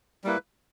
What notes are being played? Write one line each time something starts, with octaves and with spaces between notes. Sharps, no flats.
G3 A#3 E4 B4